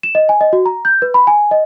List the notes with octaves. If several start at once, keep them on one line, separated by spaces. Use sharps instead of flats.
E7
D#5
G#5
D#5
F#4
A#5
G6
B4
B5
G#5
D#5